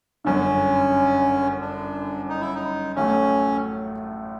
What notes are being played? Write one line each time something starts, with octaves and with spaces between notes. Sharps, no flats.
G1 F#2 D3 C#4
D4
D#4
E4
D#4
A1 A2 F#3 A3 C#4